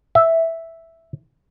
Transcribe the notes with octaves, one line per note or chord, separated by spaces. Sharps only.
E5